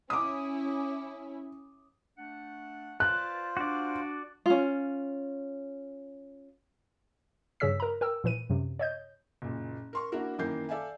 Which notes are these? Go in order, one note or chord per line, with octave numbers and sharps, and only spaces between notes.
C#4 E4 D6 D#6
A3 D4 F#5
F4 B4 C5 D5 A5 F#6
D4 F#4 D5
C#4 F4
G2 C#3 G#4 C#5 E6 B6
A#4 A#5
A#4 G5 E6
A#2 E3 B4 D#7
F#2 C3
C#5 D#5 G6
F#1 A#2
A#4 C6 C#6
A#3 D4 E4 F#4 A#4
F#2 D#3 E3 A#3 G6 C7
A4 D5 E5 F5 G#5